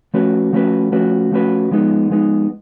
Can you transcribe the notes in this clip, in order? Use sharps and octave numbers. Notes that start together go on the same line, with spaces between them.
F3 A3 C#4 F#4 B4
F3 A3 C#4 F#4 B4
F3 A3 C#4 F#4 B4
F3 A3 C#4 F#4 B4
F3 G#3 B3 D#4
F3 G#3 B3 D#4